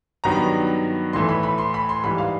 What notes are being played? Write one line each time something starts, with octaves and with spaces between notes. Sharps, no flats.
G2 D#3 F#3 B3 A#5
A2 E3 A3 C6
B5
B5
C6
B5
C6
G#2 E3 G3 B5
F5